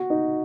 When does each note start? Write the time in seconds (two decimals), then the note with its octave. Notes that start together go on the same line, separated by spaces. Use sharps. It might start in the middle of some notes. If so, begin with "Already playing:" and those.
Already playing: F#4
0.10 D#4